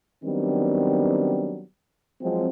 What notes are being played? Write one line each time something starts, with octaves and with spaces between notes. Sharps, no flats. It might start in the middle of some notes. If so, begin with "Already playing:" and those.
D#3 F#3 G3 B3 C4 D4
F3 F#3 G#3 C4